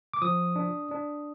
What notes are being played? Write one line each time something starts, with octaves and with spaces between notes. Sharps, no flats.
D6
F3 D#6
D4
D4